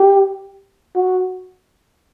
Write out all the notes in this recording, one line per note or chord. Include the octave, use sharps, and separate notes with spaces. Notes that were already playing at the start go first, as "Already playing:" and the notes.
Already playing: G4
F#4